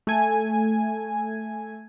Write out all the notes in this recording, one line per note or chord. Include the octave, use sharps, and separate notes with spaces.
A3 G#5